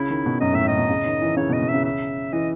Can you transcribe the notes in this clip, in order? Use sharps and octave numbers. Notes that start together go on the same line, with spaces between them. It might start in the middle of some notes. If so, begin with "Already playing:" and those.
Already playing: C#3 E4
D#3
B2
F#2 D#5
A2 E5
A2 D#5
B2
C#3
D#3
E3
C#3 C#5
B2
D#5
B2
C#3 E5
E5
E3 D#5